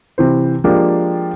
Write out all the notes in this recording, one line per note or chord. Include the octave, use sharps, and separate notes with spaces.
C3 E3 C5
F3 G#3 A#3 D4 G4